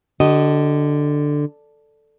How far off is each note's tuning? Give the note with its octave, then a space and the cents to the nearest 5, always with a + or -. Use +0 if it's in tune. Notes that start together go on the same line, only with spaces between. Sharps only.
D3 +5 G4 -45 D#5 -5